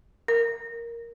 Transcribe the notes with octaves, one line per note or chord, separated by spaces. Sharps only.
A#4